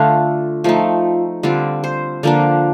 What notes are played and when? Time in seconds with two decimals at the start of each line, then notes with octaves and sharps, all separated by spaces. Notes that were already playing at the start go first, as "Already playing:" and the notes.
Already playing: D3 A3 D4 F4 F5
0.64 F3 A3 D#4
1.43 D3 G3 C4 F4 D5
1.84 C5
2.23 D3 F3 A#3 D4 D5